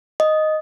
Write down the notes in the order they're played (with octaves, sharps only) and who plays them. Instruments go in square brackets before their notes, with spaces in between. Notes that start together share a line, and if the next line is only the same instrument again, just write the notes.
[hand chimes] D#5